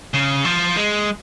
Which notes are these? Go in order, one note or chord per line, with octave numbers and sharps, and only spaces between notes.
C#3
F3
G#3